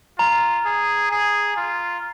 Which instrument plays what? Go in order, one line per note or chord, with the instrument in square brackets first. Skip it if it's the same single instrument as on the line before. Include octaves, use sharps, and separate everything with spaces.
[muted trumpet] F4 [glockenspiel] A#5
[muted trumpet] G#4
G#4
F4